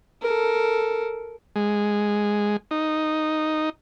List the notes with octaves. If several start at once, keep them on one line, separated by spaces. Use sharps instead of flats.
A4 A#4
G#3
D#4